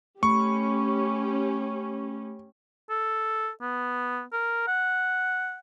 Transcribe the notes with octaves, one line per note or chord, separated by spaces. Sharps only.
A3 C#4 G4 B5 C#6
A4
B3
A#4
F#5